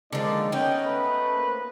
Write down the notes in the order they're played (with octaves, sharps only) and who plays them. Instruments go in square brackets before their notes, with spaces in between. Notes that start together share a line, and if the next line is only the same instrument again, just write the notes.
[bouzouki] D3 F3 [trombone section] G#3 A#3 D#4 [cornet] D5
[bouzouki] B3 D#4 [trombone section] C#4 [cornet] G5
[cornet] A3 [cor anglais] B4
[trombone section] A#3 C5